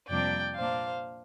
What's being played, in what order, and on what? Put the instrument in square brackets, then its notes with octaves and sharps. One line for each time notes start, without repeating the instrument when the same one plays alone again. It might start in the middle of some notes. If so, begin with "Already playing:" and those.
[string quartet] F2 C3 G3 A#3 D4 D5 G5
A#2 A#3 D4 C5 F5